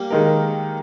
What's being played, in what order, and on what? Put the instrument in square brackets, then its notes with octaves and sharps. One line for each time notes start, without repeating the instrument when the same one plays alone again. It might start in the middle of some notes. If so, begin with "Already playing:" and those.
Already playing: [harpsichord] G3 A#3
[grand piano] D#3 G#3 D#4 A#4